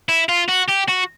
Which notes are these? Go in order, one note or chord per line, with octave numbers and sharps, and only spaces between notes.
E4
F4
F#4
G4
F#4